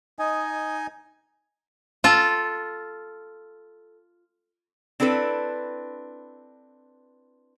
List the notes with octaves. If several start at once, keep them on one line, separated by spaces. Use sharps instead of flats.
D#4 D#5 G#5
F4 A4
C4 D4 E4 A4 B4